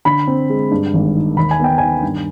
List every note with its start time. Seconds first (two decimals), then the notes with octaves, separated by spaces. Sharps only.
0.05 D3 B5
0.27 C4
0.49 G#3
0.71 G2
0.94 G#1
1.15 D#3
1.37 D#2 B5
1.51 G#5
1.60 B3 G5
1.78 D#3 G#5
2.03 G2